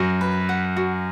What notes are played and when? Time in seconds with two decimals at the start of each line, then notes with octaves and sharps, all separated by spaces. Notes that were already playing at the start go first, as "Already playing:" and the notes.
Already playing: F#2 F#4
0.21 B4
0.49 F#5
0.77 F#4